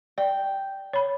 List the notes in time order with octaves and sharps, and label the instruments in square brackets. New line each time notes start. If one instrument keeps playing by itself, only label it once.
[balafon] D5 [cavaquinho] G5
[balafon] C#5 B5